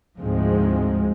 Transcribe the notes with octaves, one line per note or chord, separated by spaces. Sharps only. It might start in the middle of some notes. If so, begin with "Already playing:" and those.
D2 G#2 F3 G#3 C4